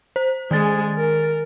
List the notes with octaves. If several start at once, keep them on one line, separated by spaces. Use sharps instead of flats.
C5
D#3 G#3 G#4 G#5 A6
A#4